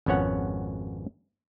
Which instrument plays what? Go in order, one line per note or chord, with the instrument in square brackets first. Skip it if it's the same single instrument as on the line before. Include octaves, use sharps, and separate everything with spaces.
[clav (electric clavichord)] G#1 F2 B3 C#4 C#5 F#5